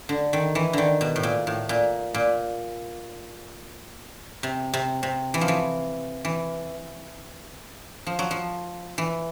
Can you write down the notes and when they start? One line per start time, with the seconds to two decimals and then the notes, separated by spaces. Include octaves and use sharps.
0.09 D3
0.33 D#3
0.55 E3
0.73 D3 D#3
1.01 B2
1.16 A2
1.23 A#2
1.47 A2
1.69 A#2
2.14 A#2
4.43 C3
4.74 C3
5.03 C3
5.34 E3
5.41 F3
5.48 E3
6.25 E3
8.06 F3
8.19 F#3
8.31 F3
8.98 E3